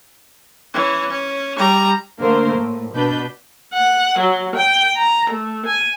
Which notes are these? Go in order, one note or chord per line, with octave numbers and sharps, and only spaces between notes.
E3 C#4
C#4
G3 A#5
D3 A3 A#3 A#4 C5
A2
B2 D4 B4 G6
F#5
F#3
G5
A#5
A3
G#5